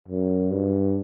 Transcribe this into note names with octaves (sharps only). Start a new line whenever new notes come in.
F#2
G2